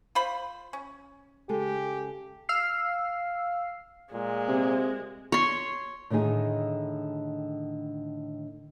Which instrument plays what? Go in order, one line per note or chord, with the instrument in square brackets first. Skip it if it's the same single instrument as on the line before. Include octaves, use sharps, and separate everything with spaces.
[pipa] F4 C5 B5
C#4
[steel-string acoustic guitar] C#3 G#3 A4 [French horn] G4
[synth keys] F5 E6 F6 C7
[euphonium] A#2 [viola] G#3
[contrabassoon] C3
[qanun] C#5 C6
[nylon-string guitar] A2 D3 D#3 D#4 G#4